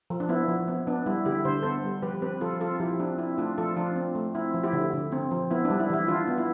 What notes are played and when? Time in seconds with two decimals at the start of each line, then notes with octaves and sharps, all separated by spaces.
0.10 F3
0.20 D4
0.29 B3 E4
0.48 F3
0.68 B3
0.87 B3 D4
1.06 G3 E4
1.25 D3 E4 G4
1.45 D3 C5
1.62 B3 A4 C5
1.84 G3
2.02 F3 G4 B4
2.22 C4 G4 B4
2.41 F3 F4 A4
2.60 C4 F4 A4
2.80 F3 E4 G4
2.99 C4 D4
3.18 C4 E4
3.38 A3 D4 F4
3.58 F3 F4 A4
3.76 F3 D4 F4
3.96 C4
4.15 A3
4.34 C4 E4
4.54 F3
4.63 E4 G4
4.73 D3
4.93 D3
5.12 C4
5.31 F3
5.51 B3 E4
5.65 D4
5.70 G3
5.80 E4
5.90 E3 E4
6.08 E3 D4 F4
6.28 B3
6.38 E4